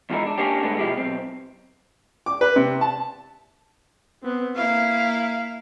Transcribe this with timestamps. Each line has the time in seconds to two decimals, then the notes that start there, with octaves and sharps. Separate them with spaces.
0.10 E2 G#2 F3 G#3 D#4 E4
0.26 D4
0.38 A#3 C#4 D4 G4
0.63 A2 D3 G#3 B3 D4
0.79 B2 F3 F#3 G#3 E4 G4
0.97 B1 C4
2.26 D6
2.41 B4
2.56 C3
2.81 A5
4.23 B3 C4
4.56 A#3 E4 F5